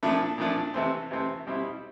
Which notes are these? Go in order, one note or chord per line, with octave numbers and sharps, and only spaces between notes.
A#2 F3 A3 D4
A#2 F3 A3 D4
C3 E3 A3 C4
C3 E3 A3 C4
B2 G3 C4 E4